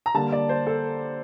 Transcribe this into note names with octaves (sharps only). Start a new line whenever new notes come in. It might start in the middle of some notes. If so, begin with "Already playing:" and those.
A#5
D3 G3 A#3 A5
D5
C5
A4